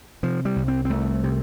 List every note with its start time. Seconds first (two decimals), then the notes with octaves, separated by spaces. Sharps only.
0.23 C3 F3
0.45 G3
0.56 C2
0.68 C4
0.85 C4
0.90 C2 A3
1.24 C3